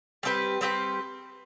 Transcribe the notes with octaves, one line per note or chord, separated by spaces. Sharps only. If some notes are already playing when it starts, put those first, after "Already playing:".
G3 C4 G4 B4
G3 C4 G4 B4